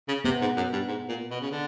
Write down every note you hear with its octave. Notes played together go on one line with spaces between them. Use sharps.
C#3
C3 B3
G#2
F#2
G2
G#2
A#2
B2
C#3
D3